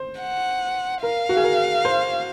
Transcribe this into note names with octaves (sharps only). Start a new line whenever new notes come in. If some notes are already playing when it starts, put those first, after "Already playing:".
Already playing: C5
F#5
A#4 F5
F#4
G#4
A#4
C5